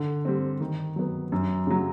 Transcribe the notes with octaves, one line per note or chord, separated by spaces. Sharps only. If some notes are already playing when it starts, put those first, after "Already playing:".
Already playing: D3
G3 C4
D#3
F#3 B3
F#2
C#3 F#3